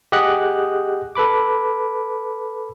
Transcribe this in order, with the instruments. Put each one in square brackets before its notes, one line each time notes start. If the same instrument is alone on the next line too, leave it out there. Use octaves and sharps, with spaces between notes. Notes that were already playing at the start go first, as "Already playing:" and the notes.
[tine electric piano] G4 G#4 D#5 F#5 F#6
A4 B4 B5 D6